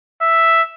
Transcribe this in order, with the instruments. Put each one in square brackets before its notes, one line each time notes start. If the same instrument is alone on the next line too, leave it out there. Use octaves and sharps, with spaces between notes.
[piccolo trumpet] E5